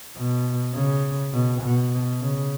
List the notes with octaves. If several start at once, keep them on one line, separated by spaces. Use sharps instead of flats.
B2
C#3
B2
B2
C#3